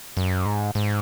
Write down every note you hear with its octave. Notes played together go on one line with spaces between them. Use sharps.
F#2
G#2
G#2